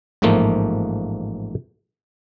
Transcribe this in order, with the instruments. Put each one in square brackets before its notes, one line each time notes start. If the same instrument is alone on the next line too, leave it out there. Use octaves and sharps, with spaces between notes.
[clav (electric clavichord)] A1 G#2 F3 A3 A#3